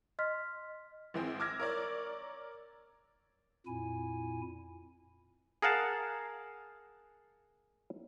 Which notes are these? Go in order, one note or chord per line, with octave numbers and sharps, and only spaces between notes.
D#5 C6 F6 B6
G#1 E3 C4 G#4
D6 E6 F6 G#6 A#6
A#4 C#5 D5
F2 A#2 E4 G#5
G#4 A#4 F5 F#5 A5